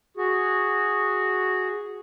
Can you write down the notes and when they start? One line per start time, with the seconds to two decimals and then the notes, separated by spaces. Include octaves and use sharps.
0.17 F#4 G#4